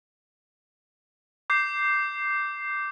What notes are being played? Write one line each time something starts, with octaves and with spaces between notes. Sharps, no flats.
D6 G6 C7